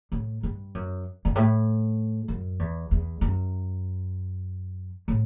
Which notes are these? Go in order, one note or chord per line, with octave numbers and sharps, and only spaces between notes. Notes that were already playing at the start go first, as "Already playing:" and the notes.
A2
G2
F#2
G2
A2
F#2
E2
E2
F#2
A2